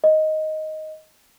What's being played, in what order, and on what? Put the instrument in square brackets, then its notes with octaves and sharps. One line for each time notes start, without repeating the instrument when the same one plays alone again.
[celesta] D#5